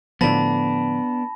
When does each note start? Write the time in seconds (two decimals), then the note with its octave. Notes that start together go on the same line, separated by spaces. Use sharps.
0.21 A2 D3 F3 B3 D4 A5 B5 A#6